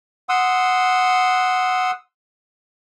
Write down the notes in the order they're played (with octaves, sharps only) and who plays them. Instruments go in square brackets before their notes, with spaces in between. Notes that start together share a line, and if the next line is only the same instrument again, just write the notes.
[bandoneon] F#5 C6 D#6 E6